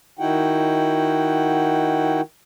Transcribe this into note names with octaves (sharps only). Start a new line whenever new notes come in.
D#3 D#4 E4 F#4 F#5 G5